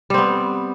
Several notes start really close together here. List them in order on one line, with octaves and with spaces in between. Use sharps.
G3 C4 B3